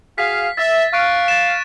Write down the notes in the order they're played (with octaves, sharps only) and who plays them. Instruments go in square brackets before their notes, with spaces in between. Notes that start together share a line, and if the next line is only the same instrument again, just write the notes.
[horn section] F#4 G#4 F5 [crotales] B6
[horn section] E5 [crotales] A6
[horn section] F5 [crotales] C#6 F#6 D7
[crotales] A6 E7